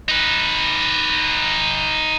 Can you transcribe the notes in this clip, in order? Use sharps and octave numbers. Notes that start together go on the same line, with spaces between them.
D#4 B4